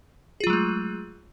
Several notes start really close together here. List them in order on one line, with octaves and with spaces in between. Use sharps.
G#4 F4 F#3 G#3 A3